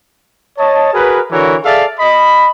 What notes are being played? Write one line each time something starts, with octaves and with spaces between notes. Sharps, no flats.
C#5 D#5 A5
F#4 G#4 A#4 B4
D3 E3 E4 F#4 A#4 C#5
G#4 A4 D5 E5 F5
D#5 B5